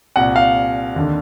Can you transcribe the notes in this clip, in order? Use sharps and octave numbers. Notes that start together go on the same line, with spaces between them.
C2 A#2 F#5
F5
D#2 D3